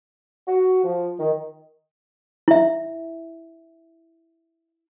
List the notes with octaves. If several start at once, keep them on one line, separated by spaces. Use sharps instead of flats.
F#4
F3
D#3
E4 E5